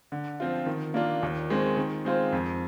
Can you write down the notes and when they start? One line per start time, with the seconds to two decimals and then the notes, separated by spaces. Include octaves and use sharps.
0.12 D3
0.40 F3 C4 F4
0.66 D#3
0.94 A#3 D4 F4
1.23 D#2
1.50 D#3 G#3 C4
1.77 D#3
2.05 G#3 C4 F4 C5
2.32 F2